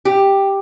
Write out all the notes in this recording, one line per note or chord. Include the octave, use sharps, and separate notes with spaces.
G4